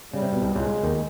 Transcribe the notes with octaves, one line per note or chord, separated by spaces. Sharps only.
C#3 G3
C3
B2
C2 C3
C#2 C#3 G#3
D#2 D#3